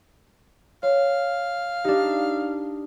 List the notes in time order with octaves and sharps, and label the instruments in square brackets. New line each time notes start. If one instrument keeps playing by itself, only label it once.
[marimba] C#5 [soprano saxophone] F5
[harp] D4 D#4 [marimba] G4